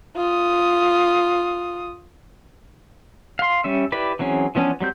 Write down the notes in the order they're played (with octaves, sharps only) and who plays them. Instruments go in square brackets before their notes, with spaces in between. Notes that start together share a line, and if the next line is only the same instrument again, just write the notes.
[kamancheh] F4 D#6
[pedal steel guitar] F5 C6
G3 C#4 E5
E4 G4 B4 D5
E3 F#3 C4 C#4 G#4
E3 F3 B3 C#4 D4
F#3 G3 C4 G6